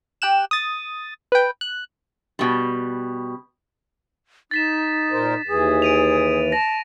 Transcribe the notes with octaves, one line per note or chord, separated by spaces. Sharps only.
G4 G5 F#6 E7
D#6 A6
B4 G5
F#6
B2 G3
D#4 A6 B6 E7
A#2 A#4 C5
D#2 E3 G#4
D7 D#7 F7
A5 A#6